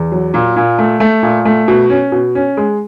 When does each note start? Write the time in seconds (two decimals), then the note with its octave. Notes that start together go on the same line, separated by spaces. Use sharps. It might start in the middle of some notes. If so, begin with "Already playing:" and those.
Already playing: E2
0.12 F#3
0.34 A#2
0.56 A#2
0.79 A3
1.00 A3
1.22 A#2
1.45 A3
1.68 B2
1.90 C#4
2.12 B2
2.35 C#4
2.57 G#3